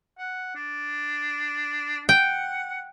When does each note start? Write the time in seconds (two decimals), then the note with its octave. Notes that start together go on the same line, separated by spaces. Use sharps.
0.18 F#5
0.55 D4
2.09 F#5 G5